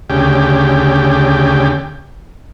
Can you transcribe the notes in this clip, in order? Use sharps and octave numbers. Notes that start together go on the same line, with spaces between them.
D2 C#3 G4